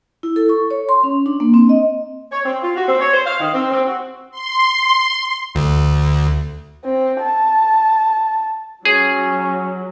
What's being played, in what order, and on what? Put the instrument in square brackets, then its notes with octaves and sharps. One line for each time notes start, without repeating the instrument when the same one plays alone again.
[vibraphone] E4
A4
C#6
C#5
C6
C#4
D4
A#3
C4
D#5
[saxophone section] C#5
C4
F4
F#4
C4
C#5
C5
F5
D#3
C4
C4
F#4
[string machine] C6
[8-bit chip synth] D2
[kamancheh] C4
A5
[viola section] F#3 [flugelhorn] C#4 [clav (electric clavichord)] G#4